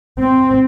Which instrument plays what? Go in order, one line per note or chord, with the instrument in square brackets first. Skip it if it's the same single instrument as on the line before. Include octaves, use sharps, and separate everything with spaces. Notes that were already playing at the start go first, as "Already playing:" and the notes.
[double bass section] C4